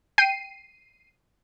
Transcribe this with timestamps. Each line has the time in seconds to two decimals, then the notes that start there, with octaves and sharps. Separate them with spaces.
0.18 G5 C7 D#7